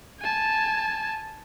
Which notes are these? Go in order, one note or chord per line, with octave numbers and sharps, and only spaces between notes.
G#5 A5